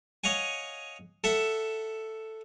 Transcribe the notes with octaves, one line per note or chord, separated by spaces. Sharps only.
C#5 D#5 F5 F#5 G#5
A4 E5 F#5